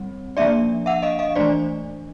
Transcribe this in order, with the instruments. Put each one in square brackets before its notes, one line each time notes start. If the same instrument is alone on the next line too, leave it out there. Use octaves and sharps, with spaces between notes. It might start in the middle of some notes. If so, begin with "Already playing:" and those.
Already playing: [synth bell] G3 C4
F3 A#3 D4 D5 E5
E5 F#5
D#5 F5
D#5 F5
E3 A3 D4 C5 D5